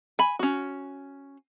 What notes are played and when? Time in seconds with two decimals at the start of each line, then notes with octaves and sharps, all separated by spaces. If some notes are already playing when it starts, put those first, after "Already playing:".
0.19 G#5 B5
0.39 C#4 F#4